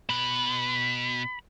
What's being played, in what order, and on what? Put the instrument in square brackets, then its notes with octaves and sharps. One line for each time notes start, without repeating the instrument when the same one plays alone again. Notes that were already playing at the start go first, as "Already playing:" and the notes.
[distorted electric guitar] B2 B4 [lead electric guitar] B5